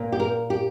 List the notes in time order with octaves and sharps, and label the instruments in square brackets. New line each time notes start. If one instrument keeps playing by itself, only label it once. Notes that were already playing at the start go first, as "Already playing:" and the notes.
Already playing: [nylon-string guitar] A#2 A#3
G4
A#4
G4